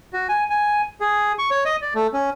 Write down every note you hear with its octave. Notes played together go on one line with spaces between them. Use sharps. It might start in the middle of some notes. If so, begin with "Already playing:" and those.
F#4
G#5
G#5
G#4
C#6
C#5
D#5
D5
A3
C#4